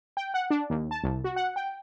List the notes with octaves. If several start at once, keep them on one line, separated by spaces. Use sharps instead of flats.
G5
F#5
D4
D#2
A5
C2
F#4
F#5
G5